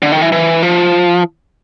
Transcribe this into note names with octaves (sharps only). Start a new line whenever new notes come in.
D3
D#3
E3
E3
F3